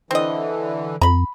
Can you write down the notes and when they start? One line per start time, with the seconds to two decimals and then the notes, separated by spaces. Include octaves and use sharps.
0.11 D3 E3 C4 D#5
1.01 F2 A#5 B5